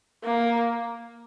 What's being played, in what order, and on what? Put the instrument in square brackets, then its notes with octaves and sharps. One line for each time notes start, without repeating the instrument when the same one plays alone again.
[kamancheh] A#3